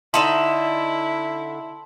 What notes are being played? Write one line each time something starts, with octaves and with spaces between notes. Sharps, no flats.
D3 D#4 E4 E5 A5 C6 F#7